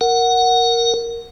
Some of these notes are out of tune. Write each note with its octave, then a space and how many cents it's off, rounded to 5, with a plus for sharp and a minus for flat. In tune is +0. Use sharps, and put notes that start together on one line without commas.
A#4 +0 F#5 +0